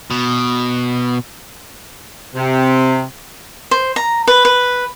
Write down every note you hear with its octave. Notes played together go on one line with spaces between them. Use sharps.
B2
C3
C5
A#5
B4
B4